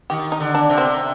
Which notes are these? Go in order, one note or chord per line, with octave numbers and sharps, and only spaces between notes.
D#3 G4
D#4
D3
D4
C3
C4